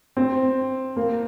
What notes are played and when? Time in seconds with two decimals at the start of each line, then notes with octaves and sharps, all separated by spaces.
0.17 C4
0.96 A#3